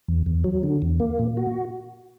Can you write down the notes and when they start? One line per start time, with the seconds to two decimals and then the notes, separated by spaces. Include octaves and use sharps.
0.08 E2
0.26 E2
0.44 F#3
0.63 D3
0.82 E2
1.00 A#3
1.19 A#2
1.37 F#4